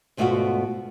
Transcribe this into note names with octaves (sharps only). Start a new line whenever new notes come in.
D2 G#2 B2 A3 F4 F#4